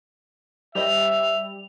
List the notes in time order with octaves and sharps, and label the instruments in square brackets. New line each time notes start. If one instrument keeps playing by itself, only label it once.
[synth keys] G3 [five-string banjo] G4 C5 D#5 [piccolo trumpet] E5 [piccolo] F7